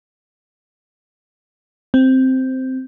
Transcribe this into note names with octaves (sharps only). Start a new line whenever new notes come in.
C4